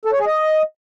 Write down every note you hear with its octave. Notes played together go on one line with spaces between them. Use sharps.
A4
C#5
G#4
D#5